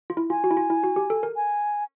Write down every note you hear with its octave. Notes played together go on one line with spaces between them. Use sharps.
F4
E4
F4 G#5
F#4
E4
F4
E4
F#4
G4
A4
A#4
G#5